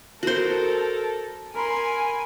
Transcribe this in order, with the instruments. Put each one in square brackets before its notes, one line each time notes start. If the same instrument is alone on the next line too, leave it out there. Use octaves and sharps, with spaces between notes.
[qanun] F#4 C5 [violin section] A4 [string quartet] A#4
[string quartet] A#4 B5 C6 [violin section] G#5